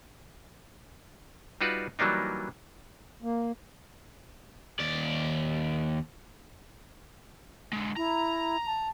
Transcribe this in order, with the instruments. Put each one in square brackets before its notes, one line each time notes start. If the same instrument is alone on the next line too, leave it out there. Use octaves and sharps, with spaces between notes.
[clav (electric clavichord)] G3 D#4 F4 F#4 B4 D5
E3 F#3 G3 A#3 D4 D#4
[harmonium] A#3
[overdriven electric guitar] D#2 D5
D3 G#3
[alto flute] E4 [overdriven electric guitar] A#5
[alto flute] A5